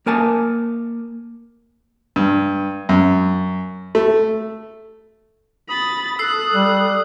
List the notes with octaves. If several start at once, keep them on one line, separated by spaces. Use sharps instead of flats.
A#3 A#4 G#5 A5
G2
F#2
A3
B5 D#6 A6
A4 E6 F#6 C7
G3